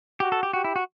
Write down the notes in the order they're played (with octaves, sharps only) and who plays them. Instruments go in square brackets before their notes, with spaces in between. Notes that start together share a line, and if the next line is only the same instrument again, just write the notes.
[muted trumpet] F#4 [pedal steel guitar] G4
[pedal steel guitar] A4
G4
[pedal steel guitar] F#4 [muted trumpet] G4
[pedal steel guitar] E4
F#4